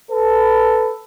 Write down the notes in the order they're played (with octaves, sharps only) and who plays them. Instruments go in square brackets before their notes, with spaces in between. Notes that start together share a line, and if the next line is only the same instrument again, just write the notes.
[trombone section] A4 B4